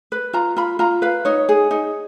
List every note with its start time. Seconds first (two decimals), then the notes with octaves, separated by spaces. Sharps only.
0.12 B4
0.33 F4 A#5
0.57 F4 B5
0.79 F4 A#5
1.02 B4 F5
1.25 D#4 C#5
1.49 G#4
1.71 D#4